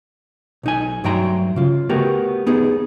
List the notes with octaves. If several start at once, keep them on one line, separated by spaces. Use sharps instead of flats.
B1 D#4 G#5
G2 F#3 A3 G5 A#5 C6
C#3 F4
A3 B3 F#4 G4 A#4
B3 D#4 G#4